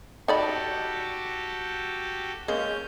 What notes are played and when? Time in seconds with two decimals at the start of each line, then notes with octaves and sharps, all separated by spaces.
0.28 D#4 F#4 G4 A4 D5 B5
2.48 C#3 G#3 A#3 C#4 G6